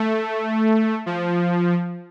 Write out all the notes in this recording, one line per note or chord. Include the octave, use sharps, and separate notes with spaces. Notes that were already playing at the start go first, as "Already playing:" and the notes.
Already playing: A3
F3